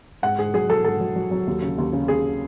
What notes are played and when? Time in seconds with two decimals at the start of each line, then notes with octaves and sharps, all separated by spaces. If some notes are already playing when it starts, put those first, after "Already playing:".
0.23 G#2 F#5
0.38 G#2 G#4
0.54 F#3 G#4
0.69 F#3 A4
0.85 G#2 A4
1.01 F#3
1.16 F#3
1.31 F#3
1.47 D#2
1.62 C#3
1.78 D#2
1.93 C#3
2.08 D#2 G#4